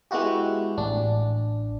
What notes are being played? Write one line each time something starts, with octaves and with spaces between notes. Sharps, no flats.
G#3 B3 E4 F#4 G4
A1 D4